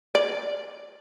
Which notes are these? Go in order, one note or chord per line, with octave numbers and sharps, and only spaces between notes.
D5